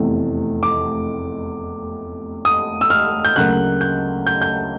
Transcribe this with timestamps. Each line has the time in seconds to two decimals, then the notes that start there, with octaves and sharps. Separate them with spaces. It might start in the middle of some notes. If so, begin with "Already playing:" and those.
Already playing: F1 E2 C3 E3 A3
0.63 D6
2.45 D#6
2.81 E6
2.90 F6
3.25 G6
3.36 D2 C#3 F#3 A#3 F#6
3.81 G6
4.27 G6
4.41 G6